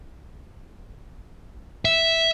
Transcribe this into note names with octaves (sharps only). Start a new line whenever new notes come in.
E5